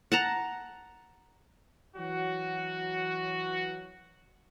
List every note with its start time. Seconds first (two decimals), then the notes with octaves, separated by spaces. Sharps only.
0.12 F#5 A5 A#5
1.97 E3 F#3 F#4